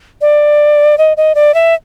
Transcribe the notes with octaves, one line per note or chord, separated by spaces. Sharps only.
D5
D#5
D#5
D5
E5